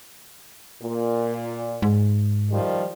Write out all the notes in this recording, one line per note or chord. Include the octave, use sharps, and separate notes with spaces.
A#2
G#2
D#3 F3 G3